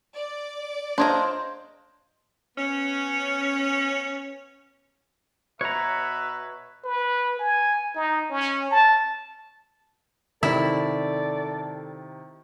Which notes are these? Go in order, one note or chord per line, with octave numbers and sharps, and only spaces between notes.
D5
D4 C5 C#5 D#5 F5 A#5
B3 C#4
B2 B4 C#5 E5 A#5
B4
G#5
D#4
C#4
A5
C3 D#3 E4 A4 D5